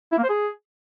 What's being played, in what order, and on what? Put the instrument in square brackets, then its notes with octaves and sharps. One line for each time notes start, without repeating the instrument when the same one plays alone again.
[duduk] E4
A#3
C5
G#4